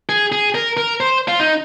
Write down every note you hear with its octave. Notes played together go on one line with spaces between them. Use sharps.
G#4
G#4
A#4
A#4
C5
F4
D#4